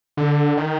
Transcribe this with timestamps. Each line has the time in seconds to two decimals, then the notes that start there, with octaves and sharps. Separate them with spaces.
0.17 D3
0.57 D#3